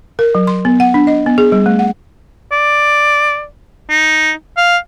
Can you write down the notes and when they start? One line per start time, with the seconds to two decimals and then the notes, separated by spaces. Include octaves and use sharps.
0.19 A#4
0.35 F#3
0.47 C6
0.65 B3
0.80 F#5
0.94 D4
1.07 D#5
1.26 B3
1.38 G#4
1.52 G3
1.66 A3
1.79 F#5
2.52 D5
3.90 D#4
4.57 F5